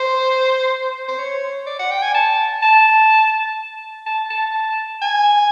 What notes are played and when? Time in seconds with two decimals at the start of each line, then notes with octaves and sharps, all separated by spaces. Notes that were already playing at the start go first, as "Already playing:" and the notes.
Already playing: C5
1.08 C5
1.19 C#5
1.67 D5
1.79 F#5
1.91 G5
2.02 G#5
2.15 A5
2.63 A5
4.06 A5
4.30 A5
5.02 G#5